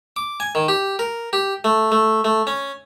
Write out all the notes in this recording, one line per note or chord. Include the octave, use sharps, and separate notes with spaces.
D6
G#5
D#3
G4
A#4
G4
A3
A3
A3
C#4